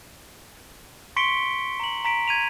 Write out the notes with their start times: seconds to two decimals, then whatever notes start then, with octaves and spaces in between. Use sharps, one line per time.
1.16 C6 C#6 B6 C#7 D7 G7
1.80 A#5 F#7
2.05 A#5 B6 D7
2.28 G#6 D#7 F7